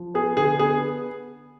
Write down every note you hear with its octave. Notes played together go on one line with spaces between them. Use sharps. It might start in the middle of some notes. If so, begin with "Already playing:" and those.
Already playing: F3
B3 G#4
D3 G#4
B3 G#4